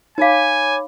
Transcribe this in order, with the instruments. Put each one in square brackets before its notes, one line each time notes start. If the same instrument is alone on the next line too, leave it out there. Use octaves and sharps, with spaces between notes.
[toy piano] D#4 F5 [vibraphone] C#5 B5 D6 [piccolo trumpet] G#5